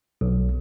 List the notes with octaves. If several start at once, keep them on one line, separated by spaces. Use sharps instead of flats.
B1